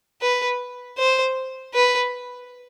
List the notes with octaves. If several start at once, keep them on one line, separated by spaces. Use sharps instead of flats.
B4
C5
B4